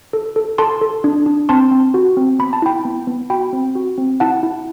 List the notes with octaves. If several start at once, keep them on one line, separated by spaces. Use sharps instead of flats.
A4
A4
A4 A5 C6
A4
D4
D4
C4 A5 C6
C4
F#4
C4
B3 B5
A5
E4 G5 B5
B3
B3
F#4 G5 B5
C4
F#4
C4
E4 F#5 A5
E4